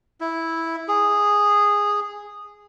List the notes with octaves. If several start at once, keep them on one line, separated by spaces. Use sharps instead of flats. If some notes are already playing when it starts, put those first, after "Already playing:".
E4
G#4